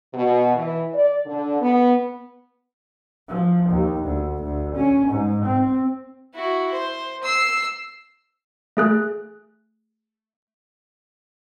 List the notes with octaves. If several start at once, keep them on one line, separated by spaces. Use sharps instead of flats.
B2
E3
D5
D3
B3
F3
D#2
D2
D2
C#4
G#2
C4
E4 F#4
C5
E6 C7
A3 G#4 F#6